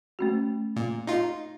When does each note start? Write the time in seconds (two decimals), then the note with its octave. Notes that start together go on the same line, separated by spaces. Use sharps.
0.19 A3 C#4 F#4
0.76 A#2
1.07 D#4 F4